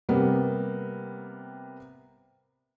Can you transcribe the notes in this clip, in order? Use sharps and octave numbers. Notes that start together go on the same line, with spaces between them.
C3 G3 A#3 B3